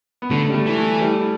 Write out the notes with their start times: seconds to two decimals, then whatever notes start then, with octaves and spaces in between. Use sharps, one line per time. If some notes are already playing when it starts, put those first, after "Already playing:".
0.22 B3
0.30 D3 A3
0.49 G3
0.54 A3
0.66 E3
0.78 A3
1.01 G3